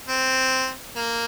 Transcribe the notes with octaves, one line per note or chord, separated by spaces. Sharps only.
C4
A#3